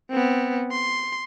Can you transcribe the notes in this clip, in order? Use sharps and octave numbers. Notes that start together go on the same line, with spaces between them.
B3 C4
C6